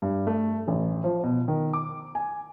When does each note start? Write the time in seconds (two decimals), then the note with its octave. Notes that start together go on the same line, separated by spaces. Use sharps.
0.02 G2
0.27 A3
0.68 A1
1.04 F3
1.23 B2
1.48 D#3
1.73 D6
2.15 G#5